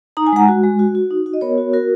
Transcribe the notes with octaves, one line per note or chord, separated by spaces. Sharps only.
D#4 A#5
G#5
G#3 F#5 A#5
F#4
G#3
F#4
F#4
D#4
F#4
D#5
B3 A#4 C#5
F#4
F#4 A#4